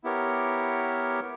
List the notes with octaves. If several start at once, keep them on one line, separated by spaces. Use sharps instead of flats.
B3 E4 G4 A#4 C#5